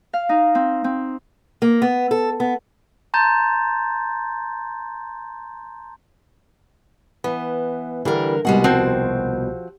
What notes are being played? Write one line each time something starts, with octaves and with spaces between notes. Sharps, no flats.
F5
D#4
C4
C4
A#3
B3
A4
B3
A5 A#5 C6 G6 A6
E3 B3
D3 E3 G3 A#4
C2 B2 G3 G#3 F#5
D#2 F3 C4 F#4